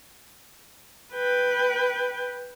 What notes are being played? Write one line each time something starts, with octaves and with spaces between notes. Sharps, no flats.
B4 G5